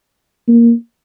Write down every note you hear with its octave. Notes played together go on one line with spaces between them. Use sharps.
A#3